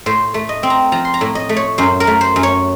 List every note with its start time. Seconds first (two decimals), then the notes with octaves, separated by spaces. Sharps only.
0.06 A2 C5
0.34 A3
0.49 D#5
0.63 C4
0.70 A#5
0.92 F3 A#5
1.05 C6
1.14 A#5
1.21 A2
1.35 D#5
1.49 A3
1.56 C#5
1.78 F#2 C5
2.00 A#4
2.07 A3
2.21 C5
2.36 F#2
2.43 C#5